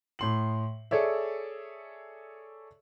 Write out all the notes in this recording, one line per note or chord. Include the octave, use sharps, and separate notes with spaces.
A2 C6 F#7
G#4 A4 C#5 D5 E5